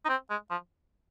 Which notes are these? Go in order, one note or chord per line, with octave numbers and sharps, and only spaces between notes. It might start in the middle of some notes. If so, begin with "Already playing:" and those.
D#4
C4
G#3
F3